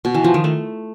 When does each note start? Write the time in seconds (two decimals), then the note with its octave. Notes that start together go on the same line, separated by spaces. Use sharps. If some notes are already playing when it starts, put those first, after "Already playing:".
0.05 B2
0.15 E3
0.24 F3
0.34 D#3
0.44 A3